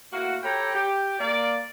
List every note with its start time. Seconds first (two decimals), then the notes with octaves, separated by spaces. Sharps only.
0.12 A2 A3 A#3 F#4
0.43 G4 A4 C#5 G5 A#5 B5
0.75 G4
1.19 A#3 D5